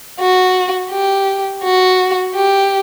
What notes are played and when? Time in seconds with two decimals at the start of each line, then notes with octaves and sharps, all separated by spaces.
0.20 F#4
0.91 G4
1.64 F#4
2.35 G4